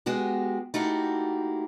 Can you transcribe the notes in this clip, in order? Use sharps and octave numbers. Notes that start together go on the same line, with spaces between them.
G#3 B3 F#4 G4
A3 A#3 D#4 E4 F#4 G4